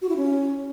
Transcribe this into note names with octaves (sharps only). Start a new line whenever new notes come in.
F#4
E4
C#4